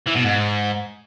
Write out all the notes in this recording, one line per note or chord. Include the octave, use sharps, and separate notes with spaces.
E3
B2
G#2